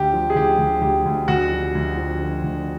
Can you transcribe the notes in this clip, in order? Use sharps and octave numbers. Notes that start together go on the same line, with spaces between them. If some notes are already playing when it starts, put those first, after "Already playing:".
Already playing: D2 G4
F3
G#4
D2 G4
D2
D2 G4
D2
D2 F#4
F3
D2
F3
D3
D2